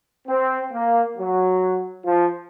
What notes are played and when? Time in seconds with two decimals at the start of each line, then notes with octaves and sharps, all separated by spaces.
0.28 C4
0.72 A#3
1.17 F#3
2.05 F3